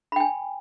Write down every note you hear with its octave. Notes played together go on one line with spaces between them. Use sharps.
G5 G#5 B5